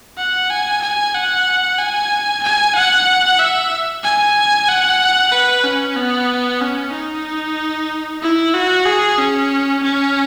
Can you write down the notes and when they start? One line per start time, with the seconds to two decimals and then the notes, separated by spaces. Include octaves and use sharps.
0.17 F#5
0.50 G#5
0.83 G#5
1.14 F#5
1.79 G#5
2.43 G#5
2.75 F#5
3.39 E5
4.04 G#5
4.68 F#5
5.32 B4
5.64 C#4
5.96 B3
6.61 C#4
6.92 D#4
8.22 E4
8.54 F#4
8.85 G#4
9.18 C#4
9.83 C#4